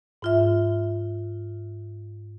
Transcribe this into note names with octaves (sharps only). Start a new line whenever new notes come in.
G#2 F4 E5